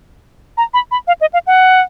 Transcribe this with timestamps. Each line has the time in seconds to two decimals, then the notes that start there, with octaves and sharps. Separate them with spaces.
0.57 A#5
0.74 B5
0.91 B5
1.07 F5
1.21 D#5
1.33 F5
1.47 F#5